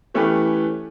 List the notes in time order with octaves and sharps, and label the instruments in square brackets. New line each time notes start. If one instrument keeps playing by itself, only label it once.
[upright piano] E3 A3 C#4 G4 B4